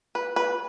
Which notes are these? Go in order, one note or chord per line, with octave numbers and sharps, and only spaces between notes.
B4
B4